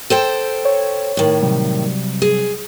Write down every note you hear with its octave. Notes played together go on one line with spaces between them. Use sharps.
A4 C5 G5
C#5
A2 D#3
C3 F#3 G3
G#4